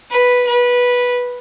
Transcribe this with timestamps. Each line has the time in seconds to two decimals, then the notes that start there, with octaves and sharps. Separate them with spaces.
0.11 B4
0.47 B4